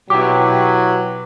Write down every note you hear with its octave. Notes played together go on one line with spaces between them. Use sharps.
B2 F#3 E4 G4 B4 D6